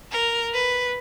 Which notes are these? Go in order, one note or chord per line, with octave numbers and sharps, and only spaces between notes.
A#4
B4